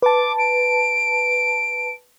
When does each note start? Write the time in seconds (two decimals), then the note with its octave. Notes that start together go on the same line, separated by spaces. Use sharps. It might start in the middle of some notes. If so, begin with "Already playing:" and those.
0.02 B4 A5 D6
0.38 D7